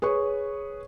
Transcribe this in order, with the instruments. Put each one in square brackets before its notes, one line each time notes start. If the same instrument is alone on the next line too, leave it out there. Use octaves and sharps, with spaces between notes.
[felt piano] G#4 B4 C#5 C#6